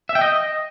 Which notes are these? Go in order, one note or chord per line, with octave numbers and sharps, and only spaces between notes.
E5
G5
D#5